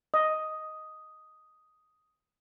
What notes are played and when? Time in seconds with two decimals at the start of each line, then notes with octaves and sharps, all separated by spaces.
0.14 D#5 D#6